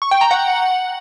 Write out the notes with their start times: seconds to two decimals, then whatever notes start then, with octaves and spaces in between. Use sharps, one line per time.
0.02 C#6
0.11 G5
0.21 A#5
0.31 F#5